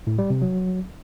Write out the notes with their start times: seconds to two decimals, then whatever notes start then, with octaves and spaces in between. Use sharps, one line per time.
0.07 A2
0.18 G3
0.30 C3
0.42 F#3